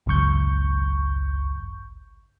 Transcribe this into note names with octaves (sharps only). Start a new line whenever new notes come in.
G#1 C#2 F#2 C#6 G6